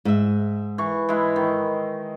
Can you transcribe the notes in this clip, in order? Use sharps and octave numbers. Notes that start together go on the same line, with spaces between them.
G#2 E5
E3 C#6
G#3 E4
D#3